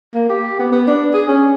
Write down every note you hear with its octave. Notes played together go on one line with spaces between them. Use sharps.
A#3
G4
B3
B3
D4
G#4
C#4